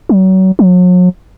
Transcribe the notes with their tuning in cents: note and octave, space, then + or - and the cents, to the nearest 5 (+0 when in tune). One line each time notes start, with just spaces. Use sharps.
F#3 +30
F#3 -40